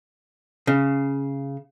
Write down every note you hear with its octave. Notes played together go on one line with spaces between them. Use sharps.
C#3